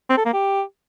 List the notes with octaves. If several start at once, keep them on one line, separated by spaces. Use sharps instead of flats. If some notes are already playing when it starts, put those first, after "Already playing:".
C4
A4
A#3
G4